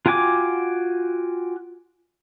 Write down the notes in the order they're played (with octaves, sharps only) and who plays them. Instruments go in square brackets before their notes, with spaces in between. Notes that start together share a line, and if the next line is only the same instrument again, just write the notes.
[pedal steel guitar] F4 F#4 G5 G#5 D6